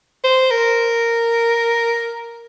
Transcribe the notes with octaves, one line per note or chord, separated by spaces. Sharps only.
C5
A#4